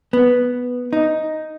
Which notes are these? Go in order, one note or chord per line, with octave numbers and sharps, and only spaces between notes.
B3
D#4